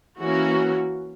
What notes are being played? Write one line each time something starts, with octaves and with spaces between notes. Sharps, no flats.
E3 A#3 C#4 F#4